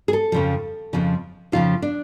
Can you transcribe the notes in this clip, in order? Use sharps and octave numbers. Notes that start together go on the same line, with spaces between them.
G#4
A4
F2 C#3 F3
F2 C#3 F3
F2 C#3 F3 F4
D4